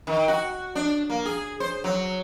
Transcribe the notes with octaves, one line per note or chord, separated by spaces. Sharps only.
D#3
F#4
D4
A#3
G#4
C5
F#3